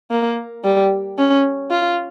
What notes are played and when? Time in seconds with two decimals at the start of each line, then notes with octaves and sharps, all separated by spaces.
0.11 A#3
0.64 G3
1.18 C#4
1.71 F4